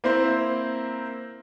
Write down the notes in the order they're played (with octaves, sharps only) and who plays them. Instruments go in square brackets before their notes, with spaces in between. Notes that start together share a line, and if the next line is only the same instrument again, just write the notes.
[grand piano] A#3 C4 E4 C5